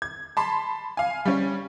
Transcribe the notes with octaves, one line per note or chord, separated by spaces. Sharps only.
G#6
A5 B5 C6
F5 G#5
G3 C#4